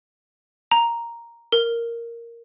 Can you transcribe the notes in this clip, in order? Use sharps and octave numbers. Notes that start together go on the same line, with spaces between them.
A#5
A#4